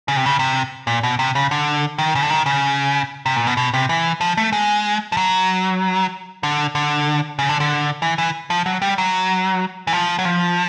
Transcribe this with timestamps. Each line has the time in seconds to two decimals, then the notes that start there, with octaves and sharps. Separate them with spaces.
0.08 C#3
0.17 C3
0.26 C#3
0.39 C3
0.87 A#2
1.03 B2
1.19 C3
1.35 C#3
1.51 D3
1.98 D#3
2.15 C#3
2.23 D3
2.30 D#3
2.46 C#3
3.26 C3
3.36 A#2
3.47 B2
3.57 B2
3.74 C3
3.89 E3
4.21 F3
4.37 A3
4.52 G#3
5.12 F3
5.17 F#3
6.43 D3
6.75 D3
7.39 C#3
7.49 D3
7.60 D3
8.02 E3
8.18 E3
8.50 F3
8.66 F#3
8.82 G3
8.98 F#3
9.87 E3
9.93 F3
10.19 F#3
10.25 F3